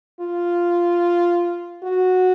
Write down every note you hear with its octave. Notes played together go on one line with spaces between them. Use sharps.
F4
F#4